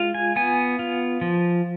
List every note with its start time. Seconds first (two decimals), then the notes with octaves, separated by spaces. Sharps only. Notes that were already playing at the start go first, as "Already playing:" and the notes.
Already playing: G#3 F4
0.14 G#5
0.36 B3 G#5
0.79 F4
1.21 F3